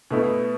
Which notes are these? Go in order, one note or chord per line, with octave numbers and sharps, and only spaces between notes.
B2 A3 E4